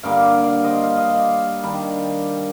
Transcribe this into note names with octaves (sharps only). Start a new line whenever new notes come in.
G2 D3 G3 A#3 D5 F5
D5 F5
C5 D#5
F5
D#5
D5 F5
D#3 G3 D4